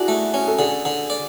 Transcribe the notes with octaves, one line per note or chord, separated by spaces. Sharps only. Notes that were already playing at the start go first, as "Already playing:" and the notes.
Already playing: D4 E4 F#4 G#4
A3
C#4
A4
D3 G#4
D3
D5